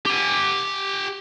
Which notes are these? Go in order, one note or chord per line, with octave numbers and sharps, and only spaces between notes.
G4 G#5